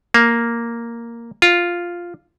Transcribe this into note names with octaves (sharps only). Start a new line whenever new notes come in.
A#3
F4